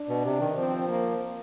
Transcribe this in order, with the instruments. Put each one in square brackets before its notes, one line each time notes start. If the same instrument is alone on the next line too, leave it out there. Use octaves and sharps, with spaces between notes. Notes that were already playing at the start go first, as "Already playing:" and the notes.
Already playing: [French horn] D4
[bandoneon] B2
C3
D#3
[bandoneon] F3 [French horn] C4
[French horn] A#3